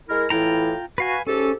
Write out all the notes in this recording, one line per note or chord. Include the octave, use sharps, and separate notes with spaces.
G#3 E4 A#4
A2 E3 E4 F4 G5 A#5
F#4 B4 F5 G#5
G#2 C#4 G4 A4